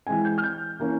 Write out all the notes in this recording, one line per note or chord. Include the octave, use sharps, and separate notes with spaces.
E3 G#3 C4 G#5
G6
F6
G6
E3 A#3 C#4